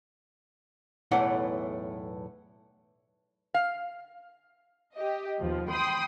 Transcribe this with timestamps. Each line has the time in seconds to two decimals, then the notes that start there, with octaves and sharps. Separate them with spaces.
1.11 B1 E2 A2 E3 A3 F#5
3.54 F5
4.95 G4 D#5
5.41 D#2 B2 F3
5.70 G5 B5 C6 D#6